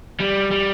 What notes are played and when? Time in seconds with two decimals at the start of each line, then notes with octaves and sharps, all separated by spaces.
0.20 G3
0.51 G3